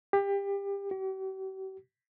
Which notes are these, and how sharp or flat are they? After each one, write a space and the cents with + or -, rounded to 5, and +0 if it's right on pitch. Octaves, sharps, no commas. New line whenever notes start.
G4 +25
G4 -45